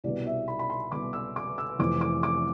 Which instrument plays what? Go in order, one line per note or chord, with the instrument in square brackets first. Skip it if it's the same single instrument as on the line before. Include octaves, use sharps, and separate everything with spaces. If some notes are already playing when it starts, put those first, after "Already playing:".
[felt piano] C2 B2 D5
E5
B5
B5
C6
C2 B2 D6
E6
D6
E6
F1 F2 E3 D6
D6
D6